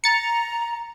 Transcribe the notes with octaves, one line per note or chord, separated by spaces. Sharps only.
A#5 A6 C#7